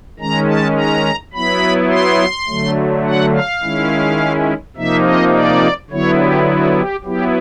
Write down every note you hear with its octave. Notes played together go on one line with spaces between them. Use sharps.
D#3 G#3 C#4 A#5
A5
A#5
F#3 B3 E4 B5
C6
D3 F#3 A3
F#5
F5
D#3 G#3 C#4 E4
C3 F3 A#3 D#4 E5
D#5
D5
D3 F#3 B3 E4 C#5
G4
F#4
G4
F#3 B3 E4 G4